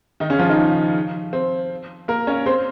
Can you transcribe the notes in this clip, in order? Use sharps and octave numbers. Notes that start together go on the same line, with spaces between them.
D#3 D#4
C#3 C#4
F3 F4
D#3 D#4
C4
A#3 A#4
C#4 C#5
C4 C5